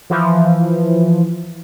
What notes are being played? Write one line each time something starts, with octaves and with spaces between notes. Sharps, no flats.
E3 F3